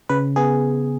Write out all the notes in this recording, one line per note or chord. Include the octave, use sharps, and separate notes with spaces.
C#3 B4
B3 G#4